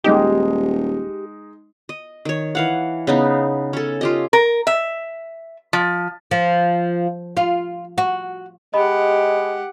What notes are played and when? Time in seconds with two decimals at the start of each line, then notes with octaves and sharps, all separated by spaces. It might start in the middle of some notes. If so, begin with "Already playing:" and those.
0.04 D#1 G#3 D#4 G4
1.89 D#5
2.25 D#3 C#5
2.55 E3 F5 F#5
3.07 C#3 B3 D#4
3.73 C#4 A4
4.01 F4 G4 D#5
4.33 A#4
4.67 E5
5.73 F3
6.31 F3
7.37 F4
7.98 F#4
8.74 G#3 G4 D#5 F#5 B5